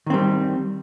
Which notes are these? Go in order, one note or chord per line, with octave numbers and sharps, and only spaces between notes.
D#3 G3 C4